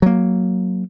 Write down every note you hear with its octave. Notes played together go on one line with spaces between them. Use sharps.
F#3 A#3